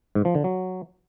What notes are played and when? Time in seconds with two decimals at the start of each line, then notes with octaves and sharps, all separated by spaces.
0.15 G#2
0.25 F3
0.35 D3
0.44 F#3